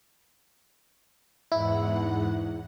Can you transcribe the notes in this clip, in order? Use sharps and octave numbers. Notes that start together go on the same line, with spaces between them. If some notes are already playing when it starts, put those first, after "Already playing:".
E2 G#2 E4 F#5